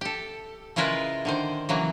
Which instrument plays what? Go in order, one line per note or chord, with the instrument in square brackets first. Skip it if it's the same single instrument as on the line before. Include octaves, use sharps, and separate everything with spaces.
[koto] G4 A4
C#3 G#3 E4 F4 A#4 B4
D3 D#3 C5
C#3 E3 F#3 A#3